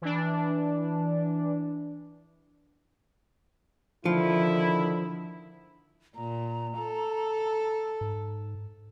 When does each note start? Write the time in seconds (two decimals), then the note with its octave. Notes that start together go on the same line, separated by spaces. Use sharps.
0.02 E3 D4
4.05 D3 D#3 F3 E4
6.16 A#2 A#5
6.78 A4
8.01 G#2